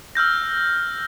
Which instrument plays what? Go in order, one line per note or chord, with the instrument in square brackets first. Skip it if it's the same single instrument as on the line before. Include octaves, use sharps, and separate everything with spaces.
[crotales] E6 F6 G6 A#6